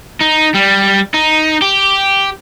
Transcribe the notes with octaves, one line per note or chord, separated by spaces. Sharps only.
D#4
G3
D#4
G4